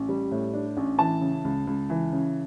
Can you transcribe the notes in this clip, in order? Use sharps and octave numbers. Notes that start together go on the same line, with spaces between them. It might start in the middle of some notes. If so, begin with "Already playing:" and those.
Already playing: A1
G3
A2
D4
A1
E3 A5
C#3
C#2
C#2
E3
C#3